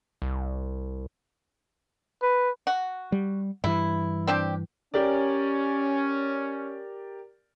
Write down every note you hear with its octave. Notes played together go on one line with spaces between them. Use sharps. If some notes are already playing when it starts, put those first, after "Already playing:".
C2
B4
F#4
G3
G2 E3 E4
C4 D4 G4
C#4 G4 A#4 D5